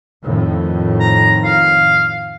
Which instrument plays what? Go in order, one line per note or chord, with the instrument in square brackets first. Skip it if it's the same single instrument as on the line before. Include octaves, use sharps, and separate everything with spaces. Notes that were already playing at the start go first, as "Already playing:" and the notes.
[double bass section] F2 A2 D#3
[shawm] A#5
F5